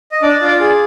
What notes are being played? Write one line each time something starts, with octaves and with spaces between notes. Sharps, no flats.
D#5
D4 D5
F4
D5
G#4